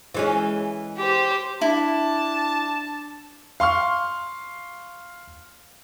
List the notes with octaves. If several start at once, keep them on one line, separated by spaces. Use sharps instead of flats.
E3 G#3 C#4
G4 C5
D4 E4 A5
F5 C6 C#6 F6